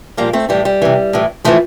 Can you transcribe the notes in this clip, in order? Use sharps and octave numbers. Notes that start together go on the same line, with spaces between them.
A#2 F3 G3 A#3
A3 C4
A2 E3 G3
G3
C3 E3
A2 E3
A2 E3 F3 A3